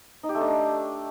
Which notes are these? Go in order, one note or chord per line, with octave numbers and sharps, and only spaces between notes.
D#4
G4
A3
D4